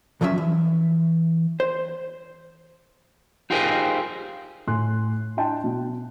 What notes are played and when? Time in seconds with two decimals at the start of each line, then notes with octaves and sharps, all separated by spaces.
0.21 B1 F2 F3 F#3 C#4 E5
0.38 E3
1.60 C5
3.50 D#4 F4 G4 G#4 A#4 C5
4.67 A2 G#5 C6 F#6
5.37 D4 E4 D#5 G5 A5 C6
5.64 B2